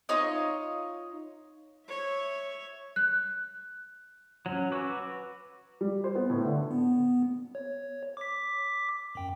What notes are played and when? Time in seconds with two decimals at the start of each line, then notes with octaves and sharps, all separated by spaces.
0.09 D#4 F4 C#5 D#5
1.88 C#5 E5
2.96 F#6
4.46 F#3 C#4
4.72 F#4 B4 C#6 D6 E6
5.81 G3
6.04 C5
6.15 B3
6.30 A2
6.45 D3
6.71 B3
7.55 C#5
8.17 D6 B6
9.15 F#2 G5